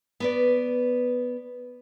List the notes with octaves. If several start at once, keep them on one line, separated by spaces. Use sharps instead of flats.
B3 B4 D5